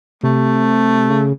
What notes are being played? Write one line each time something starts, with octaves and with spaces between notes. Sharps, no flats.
C3 A3
C#3